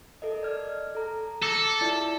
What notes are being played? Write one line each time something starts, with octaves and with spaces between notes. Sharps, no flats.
A4 A#4 D#5
D5 F6 G#6
A4 A#5
A4 D6 A#6 C#7
E4 F4 D5